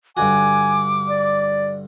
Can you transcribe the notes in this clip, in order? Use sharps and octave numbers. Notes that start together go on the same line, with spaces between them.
G2 D3 F#4 G#5 D6
D5